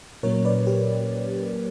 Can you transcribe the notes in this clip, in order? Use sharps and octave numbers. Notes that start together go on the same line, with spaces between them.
A#2 F#3 A#3 C#4 A#4 C#5
B4 D5
G4 B4